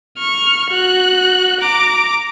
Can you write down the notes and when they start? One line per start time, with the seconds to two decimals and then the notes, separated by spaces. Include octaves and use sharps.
0.17 C#6 F6
0.70 F#4 F#6
1.61 A#5 D6